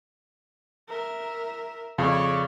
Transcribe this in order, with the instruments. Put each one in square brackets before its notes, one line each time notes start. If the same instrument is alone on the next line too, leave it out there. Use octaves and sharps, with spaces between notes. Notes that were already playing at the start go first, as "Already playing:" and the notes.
[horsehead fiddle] A#4 E5
[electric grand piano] F2 [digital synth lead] C#3 [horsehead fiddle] C#5 D5